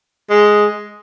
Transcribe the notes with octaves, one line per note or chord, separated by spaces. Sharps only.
G#3